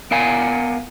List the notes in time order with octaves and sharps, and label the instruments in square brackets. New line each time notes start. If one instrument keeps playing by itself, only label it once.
[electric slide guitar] B3 A#4 F5 F#5 G#5